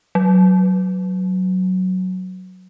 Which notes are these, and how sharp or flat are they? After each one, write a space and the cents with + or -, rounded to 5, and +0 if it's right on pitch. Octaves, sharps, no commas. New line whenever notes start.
F#3 +5